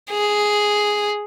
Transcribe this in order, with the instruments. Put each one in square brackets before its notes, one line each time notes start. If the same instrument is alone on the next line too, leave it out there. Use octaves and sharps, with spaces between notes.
[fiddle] G#4